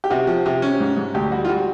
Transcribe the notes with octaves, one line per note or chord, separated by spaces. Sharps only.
G4
C3 F#4
F3
C3
C#4
G#2
G#2
D2 G4
G3 F#4
F4
G3 F#4